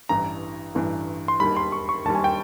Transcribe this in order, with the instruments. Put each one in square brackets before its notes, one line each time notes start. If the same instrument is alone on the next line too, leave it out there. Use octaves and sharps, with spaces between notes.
[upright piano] A1 G2 E3 [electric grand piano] A#5
[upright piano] A1 G2 E3
[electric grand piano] C6
[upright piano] E1 D#2 D#3 G3 [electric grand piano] B5
[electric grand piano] C6
C#6
C#6
[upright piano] E1 D#2 D#3 G3 [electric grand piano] A5
[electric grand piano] G#5
G5